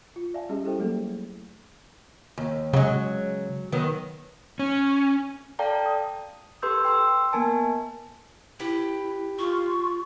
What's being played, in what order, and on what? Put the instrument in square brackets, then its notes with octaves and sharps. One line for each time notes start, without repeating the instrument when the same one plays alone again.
[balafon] F4
D5 E5 F5 G#5 A5
G3 C#4 G4 G#4 D#5
E4 G4 A4 C5 G5
F#3 G3 A3 A#3 G#4 A4
[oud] D#2
[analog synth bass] C#3 [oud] F#3 G#3
[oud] D#3 F#3 B3
[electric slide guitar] C#4
[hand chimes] A4 D5 F5 G5 A5 A#5
D#6
G4 A4 B4 C6 E6 G6
G5 C6 E6
A#3 B3 A#4 G#5 A5
[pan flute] E4 [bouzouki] G4 B4
[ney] F4 [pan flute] C#6